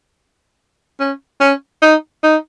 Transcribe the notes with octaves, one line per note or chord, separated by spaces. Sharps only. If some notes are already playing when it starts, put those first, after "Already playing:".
C#4
C#4
D#4
D#4